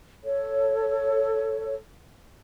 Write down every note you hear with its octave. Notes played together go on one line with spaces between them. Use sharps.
A4 C#5